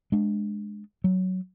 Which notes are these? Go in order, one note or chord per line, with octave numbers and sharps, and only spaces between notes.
G#3 D4
F#3